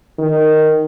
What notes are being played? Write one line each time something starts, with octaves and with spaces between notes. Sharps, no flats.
D#3